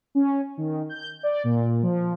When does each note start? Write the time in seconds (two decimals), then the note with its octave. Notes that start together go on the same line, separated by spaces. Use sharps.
0.15 C#4
0.57 D#3
0.89 G6
1.23 D5
1.44 A#2
1.83 F3